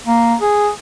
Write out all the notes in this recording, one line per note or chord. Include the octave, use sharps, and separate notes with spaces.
A#3
G#4